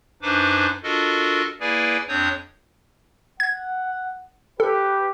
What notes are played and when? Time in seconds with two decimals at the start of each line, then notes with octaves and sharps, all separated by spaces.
0.22 F#2 D4 D#4 B4 C5 D6
0.83 D4 F4 F#4 A4 A#4 D#5
1.60 A#3 E4 G#4 B4 D5 G#5
2.08 F2 C4 D4 C#5 D#6 G6
3.40 F#5 G#6
4.60 G4 A4 B4